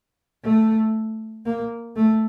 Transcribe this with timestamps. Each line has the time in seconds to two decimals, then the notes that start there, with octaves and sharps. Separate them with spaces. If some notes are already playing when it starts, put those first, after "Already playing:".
0.44 A3
1.45 A#3
1.96 A3